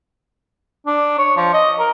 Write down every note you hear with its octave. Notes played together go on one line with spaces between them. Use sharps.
D4
C#5
F3
D#5
A#4